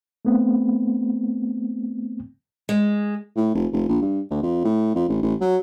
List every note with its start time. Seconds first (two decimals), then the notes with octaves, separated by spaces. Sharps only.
0.25 A3 B3 C4
2.69 G#3
3.36 A2
3.55 F1
3.72 F1
3.89 A#1
4.02 G2
4.30 D2
4.43 F2
4.65 A2
4.95 F2
5.09 A1
5.23 A1
5.41 F#3